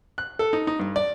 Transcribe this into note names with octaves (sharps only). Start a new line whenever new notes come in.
F#6
A4
D#4
D#4
G2
D5